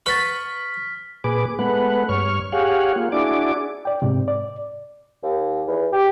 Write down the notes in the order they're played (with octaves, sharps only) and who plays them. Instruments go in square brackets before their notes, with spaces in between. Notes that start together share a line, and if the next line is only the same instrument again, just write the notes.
[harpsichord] B4 F#5 B5 [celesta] C#6 A6 [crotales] F6 B6
[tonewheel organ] A#2 G#4 B4 D6
G#3 A3 B3 B4 F#5
G2 C#5 C#6 F6
G4 G#4 C#5 F5 F#5
A#3 F4
D4 E4 F#4 G#4 D5 D6
[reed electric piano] D5 G5
G#2 C3
D5
[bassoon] D#2
E2
G4